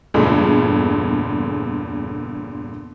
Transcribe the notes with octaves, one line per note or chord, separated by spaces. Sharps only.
E2 G2 A#2 C#3 G#3 A3